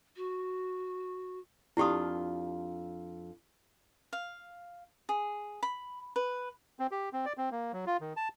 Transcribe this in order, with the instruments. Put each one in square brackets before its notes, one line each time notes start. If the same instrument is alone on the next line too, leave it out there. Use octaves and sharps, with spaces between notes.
[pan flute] F#4
[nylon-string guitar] F2 D4 F4 [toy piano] E4 G4 D#6
[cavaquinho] F5
G#4
B5
B4
[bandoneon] C4
G4
C4
D5
C4
A#3
F#3
F4
D#3
A5